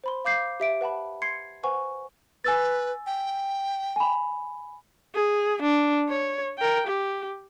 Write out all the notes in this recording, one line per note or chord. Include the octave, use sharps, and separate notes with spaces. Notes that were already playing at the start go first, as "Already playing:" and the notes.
C5 B5 C6
F5 D6 G6 C7
G4 E5 D7
B4 F#5 A5 B5
C6 G#6 C7 C#7
B4 C5 F#5 G#5 C#6
B4 G#5 E6 A6
G5
G#5 B5
G#4
D4
C#5
A#4 G5
G4